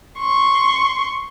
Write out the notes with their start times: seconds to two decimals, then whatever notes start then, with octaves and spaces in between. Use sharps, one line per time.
0.18 C6 C#6